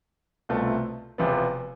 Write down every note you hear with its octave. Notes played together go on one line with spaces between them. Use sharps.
C2 B2 A3 C4 F4
E1 E2 C3 F3 B3